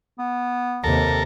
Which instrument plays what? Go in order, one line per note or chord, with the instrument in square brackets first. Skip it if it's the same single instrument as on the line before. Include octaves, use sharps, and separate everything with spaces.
[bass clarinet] B3
[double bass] D#2 C3 [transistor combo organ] A4 A#4